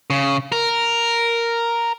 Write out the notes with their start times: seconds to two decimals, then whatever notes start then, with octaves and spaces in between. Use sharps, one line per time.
0.10 C#3
0.52 A#4